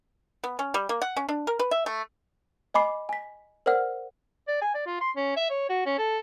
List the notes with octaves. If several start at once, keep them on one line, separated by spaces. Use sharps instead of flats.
B3
C#4
G3
A#3
F#5
C#4
D4
A#4
B4
E5
A3
D#5 G#5 B5 D6 C7
G#5 B6
A#4 C5 D5 F#5 F6
D5
G#5
D5
F4
C6
C#4
E5
C#5
F#4
C#4
A4